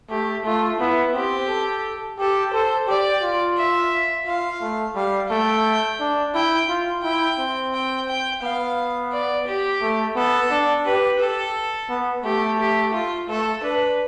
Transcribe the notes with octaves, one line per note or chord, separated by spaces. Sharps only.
A3 G4
A3 F4
B3 E4
C4 G4
A4
G4 A4
A4 C5
G4 D5
F4
E5
F4 F5
A3
G3 F5
A3 G5
D4
E4 G5
F4
E4 G5
C4
G5
G5
B3 F5
D5
G4
A3
B3 A4
D4
G4 B4
G4 A4
B3
A3 G4
G4
F4
A3 A4
D4 B4